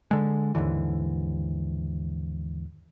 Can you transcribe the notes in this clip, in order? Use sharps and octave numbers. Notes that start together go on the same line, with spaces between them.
D3 G#3
D#2 G#2 D3 E3